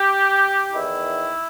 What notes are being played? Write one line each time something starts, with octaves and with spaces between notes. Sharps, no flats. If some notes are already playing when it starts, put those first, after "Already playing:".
Already playing: G4
E2 D#3 E4